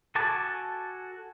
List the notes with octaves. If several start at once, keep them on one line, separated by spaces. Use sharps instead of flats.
F#4 A4 G#5 A5 D6